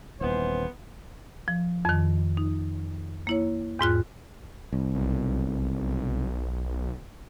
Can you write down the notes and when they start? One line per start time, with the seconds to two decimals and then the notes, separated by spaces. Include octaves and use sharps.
0.21 D#1 G#1 E3 B3 C5
1.48 F3
1.85 F2 D#3
2.37 D#4
3.27 A#3 E4 C#5
3.79 E2 G#2 F4 F#6
4.73 C2
4.95 B1